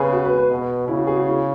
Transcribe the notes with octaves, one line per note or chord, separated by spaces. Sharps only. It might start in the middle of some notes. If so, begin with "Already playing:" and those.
Already playing: C#3 G#4 B4
F#4
B4
B4
B2
C#3 E4
F#4
G#4
F#4
E4